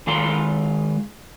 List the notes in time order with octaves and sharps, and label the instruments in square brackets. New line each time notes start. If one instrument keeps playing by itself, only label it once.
[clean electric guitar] D#3 G#3 F5 A#5 C6